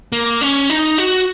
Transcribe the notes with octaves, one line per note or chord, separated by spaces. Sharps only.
A#3
C#4
D#4
F#4